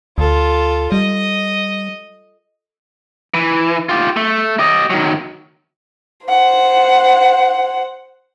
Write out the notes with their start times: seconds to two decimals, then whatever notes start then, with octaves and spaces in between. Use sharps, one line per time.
0.18 D2 F4 A4
0.92 G3 D#5
3.34 E3
3.89 F4 G4
4.16 A3
4.59 G4 D#5
4.90 D#3 F#3
6.27 C5 F#5